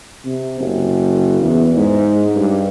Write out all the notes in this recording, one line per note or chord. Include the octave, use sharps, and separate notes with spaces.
C3
F#1
E2
G#2
G2